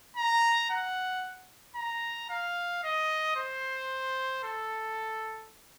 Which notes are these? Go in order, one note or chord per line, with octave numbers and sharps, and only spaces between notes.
A#5
F#5
A#5
F5
D#5
C5
A4